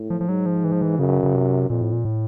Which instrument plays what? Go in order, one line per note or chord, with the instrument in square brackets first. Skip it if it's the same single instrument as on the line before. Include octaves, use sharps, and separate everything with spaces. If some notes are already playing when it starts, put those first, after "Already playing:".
Already playing: [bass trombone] A2
[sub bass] F3
F3
[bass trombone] G#2 [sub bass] F#3
[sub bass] F3
E3
F3
E3
[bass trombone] F#2 [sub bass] C#3
[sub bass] C#3
C3
[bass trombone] F2 [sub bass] A#2
[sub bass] A2
A#2
A2